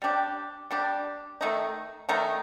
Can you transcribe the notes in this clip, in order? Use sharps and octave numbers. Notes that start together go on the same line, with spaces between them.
G3 D4 G4
G3 D4 G4
D#3 A3 D#4
D#3 A3 D#4